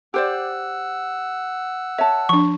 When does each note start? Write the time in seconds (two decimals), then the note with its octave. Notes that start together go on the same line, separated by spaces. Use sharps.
0.14 G4 C5 D5 F#5 E6
1.98 C#5 E5 A5
2.29 F3 D4 C#6